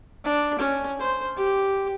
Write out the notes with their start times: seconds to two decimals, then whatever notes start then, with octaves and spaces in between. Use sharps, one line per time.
0.24 D4
0.59 C#4
0.99 C5
1.36 G4